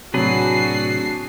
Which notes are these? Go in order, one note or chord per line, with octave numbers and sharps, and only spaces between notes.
A2 C3 F#3 D4 F#4 G#4 B4 C7